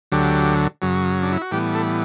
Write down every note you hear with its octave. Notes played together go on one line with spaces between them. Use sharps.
D2 D3 F#3 G4
F#2 C#3 F#3
D4
E4
F#4
A2 E3 G3 B3 G4
A4